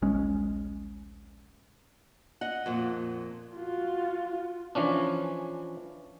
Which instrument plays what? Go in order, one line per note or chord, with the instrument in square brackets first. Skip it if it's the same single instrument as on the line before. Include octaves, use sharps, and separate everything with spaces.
[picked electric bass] D#1 A#1 G#3 C#4
[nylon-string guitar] D#5 F#5
F2 A#2
[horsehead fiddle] F4 F#4
[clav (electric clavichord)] E3 F3 C#4 D4